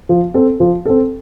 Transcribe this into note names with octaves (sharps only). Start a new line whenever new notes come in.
F3
C4 A4
F3
C4 A4